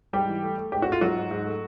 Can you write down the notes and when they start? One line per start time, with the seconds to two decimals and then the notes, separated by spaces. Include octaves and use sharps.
0.13 G#2 G3 G4
0.28 E3
0.43 A3
0.58 A3
0.72 G#2 G4
0.82 A3 F#4
0.92 F4
1.01 G#2 F#3 F#4
1.16 G#2
1.31 G#2
1.46 A3